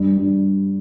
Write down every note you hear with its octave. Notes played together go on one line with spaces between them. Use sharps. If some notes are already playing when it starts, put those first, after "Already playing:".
Already playing: G2
G2